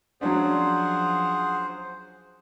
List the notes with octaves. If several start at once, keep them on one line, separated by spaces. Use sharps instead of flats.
F3 F#3 C#4 D4 G#4 C5 F#5